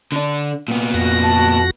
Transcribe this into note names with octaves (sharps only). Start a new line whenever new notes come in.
D3 D4
A#2 B3
F2 F#4 A#6
A5